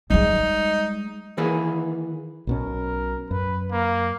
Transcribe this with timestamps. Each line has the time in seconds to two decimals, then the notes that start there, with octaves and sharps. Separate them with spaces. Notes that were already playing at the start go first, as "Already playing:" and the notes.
0.10 G3 G#3 D#4
1.37 D#3 E3 A#3 G#4 B4
2.47 B1 B2 C#4 A#4
3.31 F#2 B4
3.72 A#3